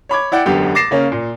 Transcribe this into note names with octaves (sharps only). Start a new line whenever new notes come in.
C#5 B5 D6 G#6
E4 D5 F#5 G5
E1 F#2 D3 B3 G4
D6 A6 A#6 C7 E7
C#3 A#3 C#4
A#2